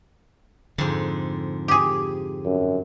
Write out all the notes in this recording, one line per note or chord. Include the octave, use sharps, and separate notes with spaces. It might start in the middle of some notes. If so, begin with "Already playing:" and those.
F2 G#2 D3
G4 G#4
F#2